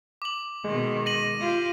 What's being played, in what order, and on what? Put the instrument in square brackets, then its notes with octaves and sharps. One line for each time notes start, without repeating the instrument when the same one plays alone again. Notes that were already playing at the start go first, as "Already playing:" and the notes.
[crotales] D6 F#7
[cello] B2 D#3 [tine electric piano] G#3
[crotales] A#6 D#7 F#7
[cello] F4 G4